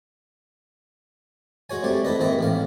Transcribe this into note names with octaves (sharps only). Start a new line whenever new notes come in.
G#3 F#4 C#5 G#5
G3 A3 C4 G4
E4 A4 B4 D#5
D#2 G#2 C4 D#5 E5
A1 A2 F5